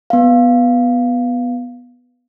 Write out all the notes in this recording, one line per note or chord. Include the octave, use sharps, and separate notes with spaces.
B3 F5